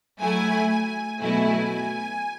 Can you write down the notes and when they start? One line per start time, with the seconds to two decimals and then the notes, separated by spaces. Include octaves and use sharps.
0.21 F#3 A3 E4 G#5
0.70 G#5
1.20 B2 F#3 A3 E4 G#5